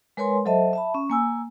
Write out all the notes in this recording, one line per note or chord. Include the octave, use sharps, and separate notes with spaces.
G#3 A#4 B4 C#5 G#5 C6
F#3 A4 C5 D#5 E5 A5
E5 A5 B5
C#4
A#3 G#5 E6